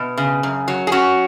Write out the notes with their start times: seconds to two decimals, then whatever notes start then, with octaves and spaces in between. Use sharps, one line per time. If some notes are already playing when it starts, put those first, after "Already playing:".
Already playing: B2
0.18 C#3
0.43 F#2
0.68 F#3
0.87 G#4
0.92 C#4 F#4